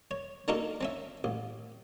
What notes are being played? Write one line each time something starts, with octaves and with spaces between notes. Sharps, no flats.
C#5
A#3 D4 D#4 F#4 A4 A#4
C4 C#4 E5
A1